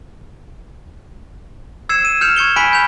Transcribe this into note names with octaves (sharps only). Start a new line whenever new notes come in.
E6 G#6 C7 C#7 E7
D#7
F6 G6 C#7 E7 F7
C#6 G#6 C#7 G7
G#5 B5 F#6 B6 D7
G6 F7